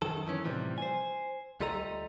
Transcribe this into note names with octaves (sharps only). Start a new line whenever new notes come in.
F#2 D#3 A4
D#3 E3 C#4
A2 C3 E3 F3 G3
C5 G#5
D2 G3 F4 A4 D#5 A#5